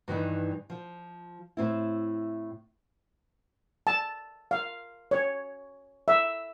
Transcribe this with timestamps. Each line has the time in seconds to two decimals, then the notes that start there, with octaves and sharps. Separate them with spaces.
0.08 G2 D#3 E3 D#4
0.70 F3
1.57 A2 C4 E4
3.87 A5
4.51 F5
5.11 C#5
6.08 E5